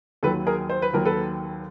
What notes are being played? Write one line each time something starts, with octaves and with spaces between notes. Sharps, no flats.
D#2 D#3 F#3 A4 B4
G#4 A#4
C5
B4
D#2 D#3 F#3 A#4
A4 B4